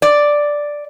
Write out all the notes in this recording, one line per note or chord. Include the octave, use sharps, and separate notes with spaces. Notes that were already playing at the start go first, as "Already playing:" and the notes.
D5